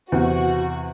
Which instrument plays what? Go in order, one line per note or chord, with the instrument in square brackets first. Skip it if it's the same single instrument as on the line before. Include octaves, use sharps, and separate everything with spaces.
[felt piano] E2 C3 [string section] F#4